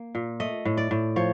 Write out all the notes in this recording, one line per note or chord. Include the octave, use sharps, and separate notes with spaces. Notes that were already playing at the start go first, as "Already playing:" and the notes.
Already playing: A#3
A#2
A3 D#5
A2
D5
A2
F3 C#5